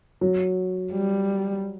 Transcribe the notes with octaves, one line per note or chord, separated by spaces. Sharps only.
F#3
G3